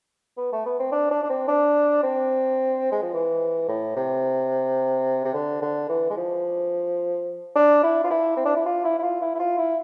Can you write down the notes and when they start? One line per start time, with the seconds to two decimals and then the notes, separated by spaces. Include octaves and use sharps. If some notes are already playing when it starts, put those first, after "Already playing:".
0.37 B3
0.52 A3
0.66 B3
0.79 C4
0.92 D4
1.11 D4
1.23 D4
1.29 C4
1.48 D4
2.03 C4
2.92 G#3
3.02 F3
3.13 E3
3.68 A2
3.96 C3
5.25 C3
5.34 D3
5.62 D3
5.89 E3
6.10 G#3
6.17 F3
7.55 D4
7.83 E4
8.04 F4
8.10 E4
8.37 C4
8.45 D4
8.56 E4
8.66 F4
8.84 E4
8.98 E4
9.03 F4
9.21 E4
9.35 E4
9.40 F4
9.58 E4